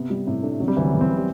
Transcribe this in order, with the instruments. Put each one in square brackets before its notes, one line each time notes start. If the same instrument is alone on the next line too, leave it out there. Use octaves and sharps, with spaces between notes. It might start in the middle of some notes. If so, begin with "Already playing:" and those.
Already playing: [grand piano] C3 [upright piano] B3
[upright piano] G3
[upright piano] A2 [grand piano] C3
[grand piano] A3 [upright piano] D4
[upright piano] C3 [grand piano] F#3
[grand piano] G3
[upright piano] D2 [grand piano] E3
[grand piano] F#3
[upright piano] E1 [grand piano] B3
[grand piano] C4
B3
G3